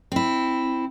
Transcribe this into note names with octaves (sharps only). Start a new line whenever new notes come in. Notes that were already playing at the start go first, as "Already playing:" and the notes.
C4 E4